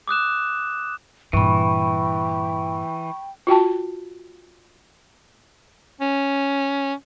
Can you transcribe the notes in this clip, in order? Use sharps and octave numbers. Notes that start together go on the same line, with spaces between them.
D6 D#6 F#6 E7
G2 A#2 E3 G5 B5 C#6
F4 F#4 G5 A5
C#4